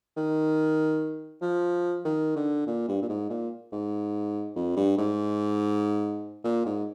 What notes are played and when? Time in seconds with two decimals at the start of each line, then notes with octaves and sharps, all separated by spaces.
0.17 D#3
1.42 F3
2.05 D#3
2.36 D3
2.67 A#2
2.88 G2
3.02 A#2
3.09 G#2
3.30 A#2
3.72 G#2
4.56 F2
4.77 G2
4.98 G#2
6.44 A#2
6.66 G#2